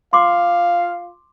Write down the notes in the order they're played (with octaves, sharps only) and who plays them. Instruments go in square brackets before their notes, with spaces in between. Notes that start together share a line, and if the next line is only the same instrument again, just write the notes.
[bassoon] F4 [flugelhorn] F5 [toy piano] C6 D6